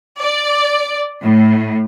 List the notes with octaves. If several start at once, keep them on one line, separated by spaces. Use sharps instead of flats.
D5
A2